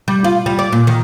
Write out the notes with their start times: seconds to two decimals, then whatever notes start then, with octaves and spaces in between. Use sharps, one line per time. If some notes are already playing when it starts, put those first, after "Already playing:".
0.08 G3
0.24 F4
0.46 G3
0.59 D5
0.72 A#2
0.87 D#3